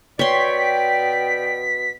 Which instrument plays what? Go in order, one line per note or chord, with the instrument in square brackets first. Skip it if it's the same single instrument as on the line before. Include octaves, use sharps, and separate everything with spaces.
[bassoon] B2 [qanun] C#5 C6 [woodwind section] D5 G5 [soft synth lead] B6